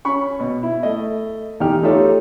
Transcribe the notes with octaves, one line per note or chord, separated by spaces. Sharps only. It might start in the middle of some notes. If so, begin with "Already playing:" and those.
C#4 B5 C#6
B2
E4
A3 D#5
E2 D#4 G4 G5 F6
A3 D#4 F4 G4 A4 C#5